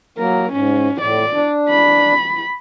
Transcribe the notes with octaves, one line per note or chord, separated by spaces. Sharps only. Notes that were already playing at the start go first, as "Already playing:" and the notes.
F#3 A#3 A#4
G#2 C#4
A2 D5
D4
B5